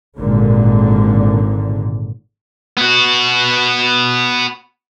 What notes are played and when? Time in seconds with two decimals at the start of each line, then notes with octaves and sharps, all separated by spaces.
0.18 G#1 A#2 D3
2.77 B3 F#4